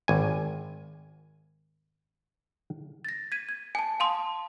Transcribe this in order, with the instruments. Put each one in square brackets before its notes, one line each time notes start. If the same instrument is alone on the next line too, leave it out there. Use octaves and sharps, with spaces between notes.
[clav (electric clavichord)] G#1 G#5
[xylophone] A6 A#6
G#6 B6 D#7
G#6
G#5 A5
F5 A5 C6 D#6